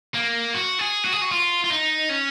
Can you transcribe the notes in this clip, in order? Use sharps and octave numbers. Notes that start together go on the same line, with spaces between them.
A#3
F#4
G#4
F#4
G#4
F#4
F4
F4
D#4
C#4